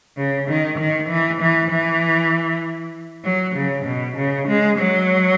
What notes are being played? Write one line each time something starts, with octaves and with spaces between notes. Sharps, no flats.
C#3
D#3
D#3
E3
E3
E3
F#3
C#3
B2
C#3
G#3
F#3